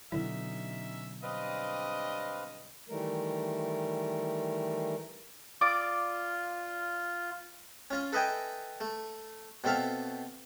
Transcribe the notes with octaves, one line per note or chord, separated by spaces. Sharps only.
B2 D3 F#3 C#4 D#4 E4 E5
G3 C4 D4 B4 D#5 F5
D#3 E3 G3 A3 A#4
F4 D5 D6 D#6
C#4 F4
A4 B4 D#5 E5 G5 G#5
A3
B2 C4 A4 E5 F5